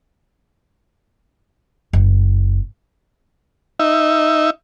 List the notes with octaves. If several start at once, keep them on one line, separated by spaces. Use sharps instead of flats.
F#1
D#4 E5